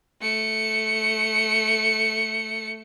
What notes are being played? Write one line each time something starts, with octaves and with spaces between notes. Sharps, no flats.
A3 C#7